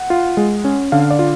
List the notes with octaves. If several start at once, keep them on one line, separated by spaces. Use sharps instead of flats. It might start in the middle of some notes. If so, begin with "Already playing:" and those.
Already playing: F#5
F4
G#3
C#4
D3 F5
D5
F4